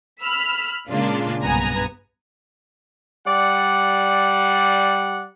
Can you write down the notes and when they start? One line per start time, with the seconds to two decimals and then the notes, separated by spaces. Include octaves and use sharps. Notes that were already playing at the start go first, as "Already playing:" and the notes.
0.21 B5 E6 F6 B6
0.88 A#2 C#3 G#3 A#3 D4 F4
1.42 B1 G2 B3 G#5 A#5
3.26 G3 D5 F#5